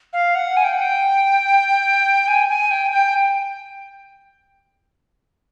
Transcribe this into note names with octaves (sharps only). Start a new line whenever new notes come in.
F5
F#5
G#5
G5
F#5
G5
G#5
G#5
G5
G5